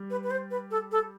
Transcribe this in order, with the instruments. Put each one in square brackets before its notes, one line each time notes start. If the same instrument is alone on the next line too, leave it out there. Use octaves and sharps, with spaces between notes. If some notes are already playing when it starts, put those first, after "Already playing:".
Already playing: [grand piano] G3
[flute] B4
B4
C5
B4
A4
A4